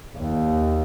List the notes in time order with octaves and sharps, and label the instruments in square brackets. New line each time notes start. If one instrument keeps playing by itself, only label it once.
[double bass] D#2